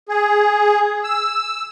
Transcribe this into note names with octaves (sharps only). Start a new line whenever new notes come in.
G#4
E6